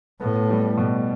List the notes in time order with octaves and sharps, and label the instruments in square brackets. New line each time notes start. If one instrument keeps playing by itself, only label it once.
[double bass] A2 [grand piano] B3
[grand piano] G3
B2